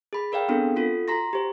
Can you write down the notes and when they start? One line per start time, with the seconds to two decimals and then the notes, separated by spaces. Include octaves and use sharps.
0.13 G#4 B5
0.32 G#4 A#4 D5 F5 G5
0.49 B3 C4 D4 F#4 A4
0.76 F4 F#4 A4
1.08 F#4 A#5 C6 A#6
1.33 G4 C5